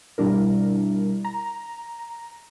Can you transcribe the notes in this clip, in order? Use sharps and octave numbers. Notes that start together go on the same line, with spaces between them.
B2 G3 D4 E4 A#4
A#5